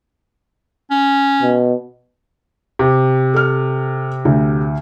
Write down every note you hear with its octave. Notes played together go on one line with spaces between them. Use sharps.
C#4
B2
C3
A4 F6
D2